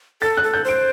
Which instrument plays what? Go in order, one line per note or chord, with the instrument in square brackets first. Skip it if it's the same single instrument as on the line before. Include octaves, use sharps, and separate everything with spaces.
[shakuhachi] A4 [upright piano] A6
[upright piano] F#6
[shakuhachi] A4
[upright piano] G6
[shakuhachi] C5 [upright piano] D7